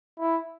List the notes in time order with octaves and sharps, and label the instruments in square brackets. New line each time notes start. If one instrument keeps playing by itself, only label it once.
[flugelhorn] E4